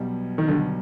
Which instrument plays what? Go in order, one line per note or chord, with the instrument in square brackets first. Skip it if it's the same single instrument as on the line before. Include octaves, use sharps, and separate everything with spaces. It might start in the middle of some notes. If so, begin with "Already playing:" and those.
Already playing: [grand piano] B1 B2 G3
[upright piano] D#3
[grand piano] B1 B2 G3 [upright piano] D3